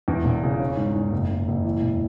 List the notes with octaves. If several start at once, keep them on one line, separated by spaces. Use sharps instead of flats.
E2
E1
C#3
C#4
G#2
G#2
F#1
F#1
F#1
E3
E1